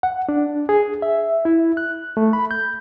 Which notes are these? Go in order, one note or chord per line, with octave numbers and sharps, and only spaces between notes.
F#5
D4
G#4
E5
E4
F#6
A3
B5
G6